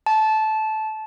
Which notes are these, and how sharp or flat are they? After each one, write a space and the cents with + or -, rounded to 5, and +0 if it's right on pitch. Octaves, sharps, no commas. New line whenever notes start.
A5 -15